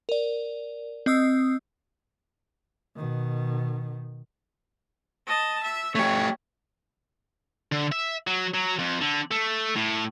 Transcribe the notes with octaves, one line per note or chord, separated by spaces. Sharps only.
A#4 D5
C4 D#5 D#6 E6
B2 D#3
D#5 A5
E5
A3 G4 C#5
D3
E5
F#3
F#3
F2
D3
A3
A2